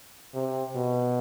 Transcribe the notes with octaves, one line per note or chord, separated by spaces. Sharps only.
C3
B2